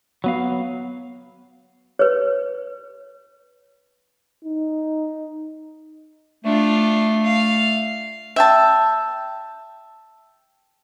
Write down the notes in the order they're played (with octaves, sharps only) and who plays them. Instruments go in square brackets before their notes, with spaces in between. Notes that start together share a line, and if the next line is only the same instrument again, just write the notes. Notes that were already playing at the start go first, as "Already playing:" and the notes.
[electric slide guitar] F#3 B3 F5
[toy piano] B4 C#5
[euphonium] D#4
[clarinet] A3 [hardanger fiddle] D4 F4
[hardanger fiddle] F5
[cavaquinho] E5 G5 A5